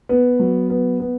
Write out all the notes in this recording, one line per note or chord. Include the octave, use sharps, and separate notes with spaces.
B3
F#3
B3
B3